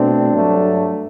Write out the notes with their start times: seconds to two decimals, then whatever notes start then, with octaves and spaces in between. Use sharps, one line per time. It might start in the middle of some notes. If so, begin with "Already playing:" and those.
Already playing: B2 A3 C4 D4
0.33 G2 F#3 A3